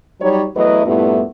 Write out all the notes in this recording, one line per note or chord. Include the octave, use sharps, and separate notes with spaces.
F#3 G3 D#4 C#5
E2 F#3 A3 E4 B4 D#5
G2 A#2 A3 B3 E4